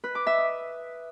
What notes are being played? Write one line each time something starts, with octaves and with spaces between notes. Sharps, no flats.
B4
D6
E5
D#6